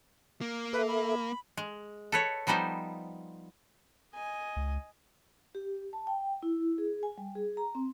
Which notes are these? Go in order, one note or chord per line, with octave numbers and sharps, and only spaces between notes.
A#3
A4 B4 E5
B5
G#3
A4 B4 C#5
F3 G3 B3 D#4 C5
D#5 G#5
C#2
G4
A5
G5
E4
G#4
G#5
G3
G#4
A#5
C4